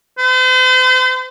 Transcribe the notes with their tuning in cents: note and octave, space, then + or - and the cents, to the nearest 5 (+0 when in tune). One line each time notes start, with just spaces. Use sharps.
C5 -45